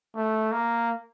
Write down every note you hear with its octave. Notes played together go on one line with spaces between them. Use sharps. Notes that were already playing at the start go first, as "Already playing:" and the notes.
A3
A#3